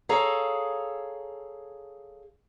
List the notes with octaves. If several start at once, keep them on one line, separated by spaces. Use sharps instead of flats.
G#4 A4 C#5 F5 A#5